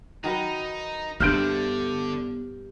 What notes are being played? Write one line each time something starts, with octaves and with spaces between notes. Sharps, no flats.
D#3 F#3 D#4 B4
G2 D3 B3 C5 E5 F6 G6 D7